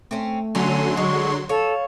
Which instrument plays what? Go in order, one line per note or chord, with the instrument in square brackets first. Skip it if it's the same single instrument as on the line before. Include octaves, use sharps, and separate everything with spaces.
[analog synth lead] A3 [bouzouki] C4 C#4
[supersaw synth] D3 F#3 C6 [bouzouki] C#4 [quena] A4
[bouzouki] G#3 [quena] C#6
[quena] A4 [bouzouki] C#5 [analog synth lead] F5